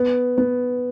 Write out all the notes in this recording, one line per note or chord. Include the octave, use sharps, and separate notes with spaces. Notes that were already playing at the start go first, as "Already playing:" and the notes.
Already playing: B3
B3